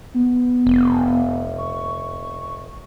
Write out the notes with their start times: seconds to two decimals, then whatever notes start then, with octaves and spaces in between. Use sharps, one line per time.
0.14 B3
0.67 F1
1.58 C#6